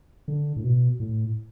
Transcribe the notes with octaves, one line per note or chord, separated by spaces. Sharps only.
D3
A2
B2
A2